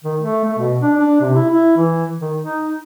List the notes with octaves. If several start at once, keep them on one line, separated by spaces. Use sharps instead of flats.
D#3
A3
A3
B2
D4
D4
C3
E4
E4
E3
D#3
D#4